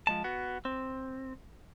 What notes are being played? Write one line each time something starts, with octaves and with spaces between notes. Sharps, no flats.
F3 G#3 A5
B3 F#4
C4